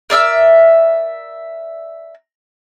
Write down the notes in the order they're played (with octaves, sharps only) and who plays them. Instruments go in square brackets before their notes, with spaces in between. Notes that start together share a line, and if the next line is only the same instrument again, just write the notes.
[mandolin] A#4 D5 E5 E6